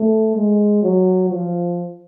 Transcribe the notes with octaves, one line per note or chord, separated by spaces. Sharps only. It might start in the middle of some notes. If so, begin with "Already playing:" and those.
Already playing: A3
G#3
F#3
F3